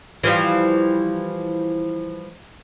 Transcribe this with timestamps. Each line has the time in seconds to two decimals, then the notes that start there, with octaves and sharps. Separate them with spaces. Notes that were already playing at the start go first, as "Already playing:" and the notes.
0.23 E3 F3 G3